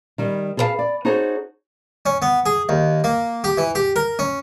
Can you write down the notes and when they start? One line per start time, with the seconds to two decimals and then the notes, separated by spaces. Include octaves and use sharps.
0.18 D#3 G3
0.57 G#4 A4 B4 C#5 F5 A5
0.79 D5
1.05 D#4 F#4 G#4 A4 C5 C#5
2.06 C#4
2.22 B3
2.46 G#4
2.69 D#2
3.04 A#3
3.44 G4
3.58 E3
3.75 G4
3.96 A#4
4.19 C#4